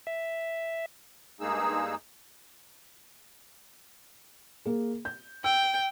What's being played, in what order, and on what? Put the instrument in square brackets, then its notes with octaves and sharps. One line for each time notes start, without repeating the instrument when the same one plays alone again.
[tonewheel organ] E5
[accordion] G2 G#3 A#3 D#4 G#4 E6
[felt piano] A#3 G#4
G6
[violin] G5 [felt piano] E6